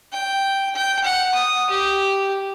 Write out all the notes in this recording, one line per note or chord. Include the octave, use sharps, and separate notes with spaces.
G5
G5
F#5
D#6
G4